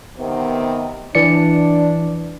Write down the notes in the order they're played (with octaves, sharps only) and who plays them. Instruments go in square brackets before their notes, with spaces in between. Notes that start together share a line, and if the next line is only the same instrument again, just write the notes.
[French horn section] C3 D#3 B3
[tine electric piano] E3 D5 C#7 [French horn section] D4